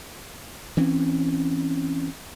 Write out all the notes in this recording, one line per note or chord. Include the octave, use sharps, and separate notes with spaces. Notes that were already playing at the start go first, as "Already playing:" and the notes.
E3 C4 C#4